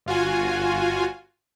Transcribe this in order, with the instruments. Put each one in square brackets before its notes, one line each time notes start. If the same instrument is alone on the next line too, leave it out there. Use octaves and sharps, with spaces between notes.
[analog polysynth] G1 F4 F#4 G#5